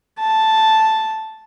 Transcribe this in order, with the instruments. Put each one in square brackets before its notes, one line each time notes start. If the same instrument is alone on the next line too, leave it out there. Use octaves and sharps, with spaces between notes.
[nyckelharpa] A5